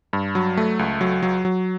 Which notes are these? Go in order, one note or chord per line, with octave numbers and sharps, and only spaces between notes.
G2
F#3
A3
C#2
F#3
F#3
F#3